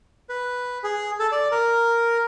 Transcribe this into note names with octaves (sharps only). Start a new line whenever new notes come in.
B4
G#4
A4
D5
A#4